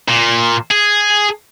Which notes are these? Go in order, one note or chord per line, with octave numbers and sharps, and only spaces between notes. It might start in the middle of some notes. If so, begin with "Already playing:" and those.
A#2
G#4